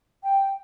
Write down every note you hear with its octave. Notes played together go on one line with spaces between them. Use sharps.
G5